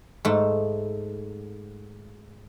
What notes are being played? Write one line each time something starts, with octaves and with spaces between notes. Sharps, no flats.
G#2 A3